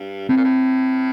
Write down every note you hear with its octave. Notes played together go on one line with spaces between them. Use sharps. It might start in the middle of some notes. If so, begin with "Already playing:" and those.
Already playing: G2
A2 C4
A#2
A2